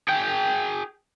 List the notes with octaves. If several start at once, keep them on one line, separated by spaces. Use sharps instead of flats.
G#4 G5